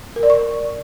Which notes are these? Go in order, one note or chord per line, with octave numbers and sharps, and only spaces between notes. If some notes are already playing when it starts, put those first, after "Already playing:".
A#4
D5
C#6